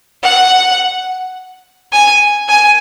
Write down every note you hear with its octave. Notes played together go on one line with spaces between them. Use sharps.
F#5
G#5
G#5